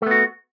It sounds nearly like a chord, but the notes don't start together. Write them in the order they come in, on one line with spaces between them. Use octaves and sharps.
A3 B3 F#4